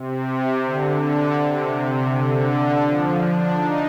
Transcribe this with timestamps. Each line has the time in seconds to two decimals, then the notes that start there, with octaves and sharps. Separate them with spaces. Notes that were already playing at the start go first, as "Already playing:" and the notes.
Already playing: C3
0.65 D3
1.01 D3
1.38 C3
1.74 C3
2.11 D3
2.85 F3
3.21 D4
3.57 D#4